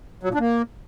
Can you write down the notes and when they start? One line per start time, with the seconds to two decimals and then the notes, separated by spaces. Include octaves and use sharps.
0.23 F#3
0.29 A#2
0.34 D4
0.40 A#3